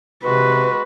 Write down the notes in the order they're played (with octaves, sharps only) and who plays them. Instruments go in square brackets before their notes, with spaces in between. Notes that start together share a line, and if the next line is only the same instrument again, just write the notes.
[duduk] C3 [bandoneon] G#3 F#4 [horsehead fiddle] B4